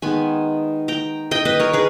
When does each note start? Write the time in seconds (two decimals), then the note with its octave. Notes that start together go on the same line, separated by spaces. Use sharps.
0.02 D#3 G#3 B3 G#5 B5
0.88 G5 A#5
1.31 D#5 G5
1.45 B4 D#5
1.60 A#4 C#5
1.73 G#4 B4